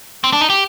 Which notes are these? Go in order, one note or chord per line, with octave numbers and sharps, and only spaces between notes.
C4
D4
D#4
G4